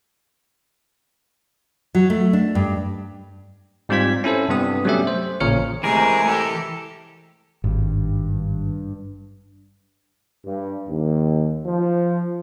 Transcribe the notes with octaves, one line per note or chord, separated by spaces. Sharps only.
F#3
A3
D4
G2
G#2 G3 C4 F4 G#6 B6
C#4 E4 A4 C5
G2 C3 B3 D#6
F#3 G3 A3 C#4 G4 E5
C5
A1 A#2 C#3 C#5 F6 C#7
C3 E3 G#3 A3 G#4 A#4
G4 A4
G#1 G2
G2
D#2
F3